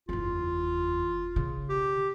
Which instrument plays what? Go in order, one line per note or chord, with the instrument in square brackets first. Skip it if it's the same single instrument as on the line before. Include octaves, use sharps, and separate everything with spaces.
[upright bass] F#1 E2 [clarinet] F4
[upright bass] C#3
[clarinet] G4